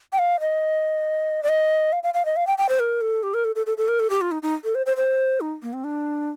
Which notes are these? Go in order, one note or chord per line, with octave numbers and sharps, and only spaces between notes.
G5
F5
D#5
D5
D#5
F5
F5
F5
D#5
F5
G5
G5
C5
A#4
A4
G4
A#4
A4
A4
A4
A4
A#4
A4
G4
F4
D#4
D#4
A4
C5
C5
C5
D#4
A#3
C4
D4